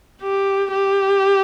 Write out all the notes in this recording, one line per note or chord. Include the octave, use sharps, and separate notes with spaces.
G4
G4